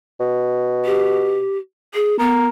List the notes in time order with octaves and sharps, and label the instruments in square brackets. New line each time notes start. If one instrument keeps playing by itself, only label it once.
[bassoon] B2
[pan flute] G4
G#4
[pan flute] B3 [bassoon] A#4